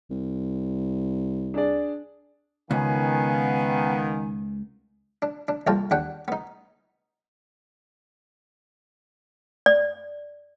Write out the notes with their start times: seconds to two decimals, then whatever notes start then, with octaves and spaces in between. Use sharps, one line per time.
0.11 C2
1.54 D4 G#4 D5
2.71 C#2 D#3 B3 F5 F#5 G#5
5.22 D4
5.48 D4
5.67 C2 F2 A#3 F4 G5 A5
5.91 D#2 D4 F#5 G5
6.28 B3 D#4
9.66 D5